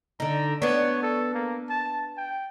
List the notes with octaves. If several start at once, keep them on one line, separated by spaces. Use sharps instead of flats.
D3 D#4 A#5
B3 D4 C#5
A4
A#3
A5
G5